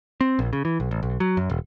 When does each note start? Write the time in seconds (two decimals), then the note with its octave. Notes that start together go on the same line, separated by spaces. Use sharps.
0.21 C4
0.39 A#1
0.53 C#3
0.65 E3
0.80 B1
0.91 A1
1.03 B1
1.20 F#3
1.37 F#2
1.50 E1